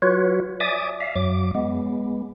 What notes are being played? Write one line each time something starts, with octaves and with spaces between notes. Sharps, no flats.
F#3 F4 F#4 B4 C#5
D5 E5 G#5 D6 D#6
E5 F5
F#2 F#3 D6
G#3 B3